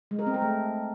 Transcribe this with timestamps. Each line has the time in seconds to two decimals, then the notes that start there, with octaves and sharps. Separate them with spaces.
0.11 G#3
0.19 A#4
0.26 C4
0.34 A#4
0.42 A3